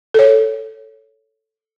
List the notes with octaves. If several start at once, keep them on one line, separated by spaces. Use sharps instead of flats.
A4 C#5